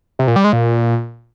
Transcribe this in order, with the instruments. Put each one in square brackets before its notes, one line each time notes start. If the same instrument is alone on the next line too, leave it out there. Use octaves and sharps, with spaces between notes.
[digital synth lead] C3
A#2
G3
G#3
A#2